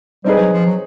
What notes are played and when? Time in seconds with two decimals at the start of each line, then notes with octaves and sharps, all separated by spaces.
0.24 G3 C4 D#4 G#4 B4
0.39 F#3
0.52 F3
0.66 F#3